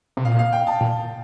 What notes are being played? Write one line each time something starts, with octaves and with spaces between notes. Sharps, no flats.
C3
A#2 F5
F5
G5
A5
A#2